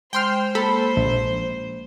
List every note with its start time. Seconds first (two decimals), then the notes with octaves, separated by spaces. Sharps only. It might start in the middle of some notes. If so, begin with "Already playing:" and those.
0.13 G#3 C5 G5 C6 F6
0.55 A#3 A4 B5
0.96 A#1